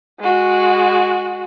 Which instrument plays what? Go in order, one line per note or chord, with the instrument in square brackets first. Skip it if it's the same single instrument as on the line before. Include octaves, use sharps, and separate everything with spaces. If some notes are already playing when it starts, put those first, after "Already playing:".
[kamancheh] G#3 F#4